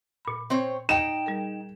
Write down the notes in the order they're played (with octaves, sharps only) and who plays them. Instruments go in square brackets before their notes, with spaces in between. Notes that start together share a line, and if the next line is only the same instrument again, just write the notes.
[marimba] A#2 B5
[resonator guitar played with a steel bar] C4 C5 C#5
[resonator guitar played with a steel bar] D#4 G5 [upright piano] E7
[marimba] G3 G#4 A#4